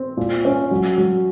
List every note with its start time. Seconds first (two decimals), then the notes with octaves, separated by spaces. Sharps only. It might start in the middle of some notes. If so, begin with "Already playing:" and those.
Already playing: C4
0.17 A#2
0.45 C#4
0.71 F#3
0.98 F#3